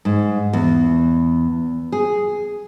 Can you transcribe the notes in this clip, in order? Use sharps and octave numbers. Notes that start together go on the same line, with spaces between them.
G#2
E2
G#4